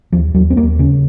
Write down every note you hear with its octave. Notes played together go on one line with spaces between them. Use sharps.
D#2 F3
D#2 F#3
C4
D#2 A#3
C#3 C#4